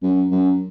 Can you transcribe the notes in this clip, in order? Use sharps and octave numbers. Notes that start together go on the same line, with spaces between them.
F#2
F#2